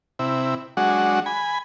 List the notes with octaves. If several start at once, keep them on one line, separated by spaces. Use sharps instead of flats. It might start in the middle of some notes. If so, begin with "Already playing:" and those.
C3 E4
F#3 G#3 D4 F#4
G#5 B5